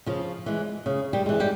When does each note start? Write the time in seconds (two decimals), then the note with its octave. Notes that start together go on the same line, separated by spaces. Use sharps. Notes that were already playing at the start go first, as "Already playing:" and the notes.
0.06 C#3 F3 F4
0.46 E3 G#3
0.86 C#3
1.13 G3 G4
1.26 E3 G#3
1.40 G3 G4